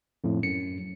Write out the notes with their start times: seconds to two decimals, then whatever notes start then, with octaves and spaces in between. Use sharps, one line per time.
0.24 F2 A2
0.43 F#2 C#7